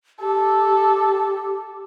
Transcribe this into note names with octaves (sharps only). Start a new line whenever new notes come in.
G4 A4